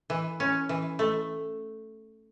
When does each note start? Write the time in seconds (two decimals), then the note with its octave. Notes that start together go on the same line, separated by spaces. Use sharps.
0.10 E3
0.40 C#4
0.69 E3
0.99 A3